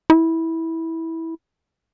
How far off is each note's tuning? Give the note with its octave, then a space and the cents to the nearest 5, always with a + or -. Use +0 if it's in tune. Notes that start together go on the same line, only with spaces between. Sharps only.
E4 -15